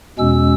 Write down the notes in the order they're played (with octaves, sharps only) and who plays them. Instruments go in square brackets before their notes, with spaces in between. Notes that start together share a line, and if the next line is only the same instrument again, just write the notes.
[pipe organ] E2 B2 G#3 C#4 E6